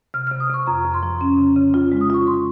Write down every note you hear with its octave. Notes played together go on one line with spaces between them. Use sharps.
C3 F6
C3 F6
D#6
C3 C#6
F2 A#5
F2
C6
F3
C#4
C#3
C#3
F4
G#3
D#6
F4 C#6
C6